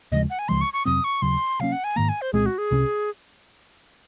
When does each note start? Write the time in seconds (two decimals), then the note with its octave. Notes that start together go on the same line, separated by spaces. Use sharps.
0.12 D#2 C#3 F3 G#3 D#5
0.30 F#5
0.39 G#5
0.48 C#2 C#3 F3 G#3 C6
0.61 C#6
0.73 C#6
0.85 F2 C3 F#3 C4 D#6
1.04 C#6
1.22 D#2 C#3 F#3 C6
1.60 C3 F#3 A#3 C#4 F5
1.72 F#5
1.84 G#5
1.96 G#2 D#3 A#3 A#5
2.09 G#5
2.22 C5
2.33 C2 A#2 G#3 C4 G#4
2.46 F#4
2.58 G#4
2.71 C2 C3 F#3 C#4